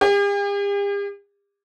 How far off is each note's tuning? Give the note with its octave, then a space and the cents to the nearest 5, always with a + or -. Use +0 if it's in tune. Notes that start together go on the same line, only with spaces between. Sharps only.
G4 +45